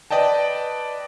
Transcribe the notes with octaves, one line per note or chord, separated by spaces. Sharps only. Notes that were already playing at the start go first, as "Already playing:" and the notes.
B4 D5 D#5 G5 A5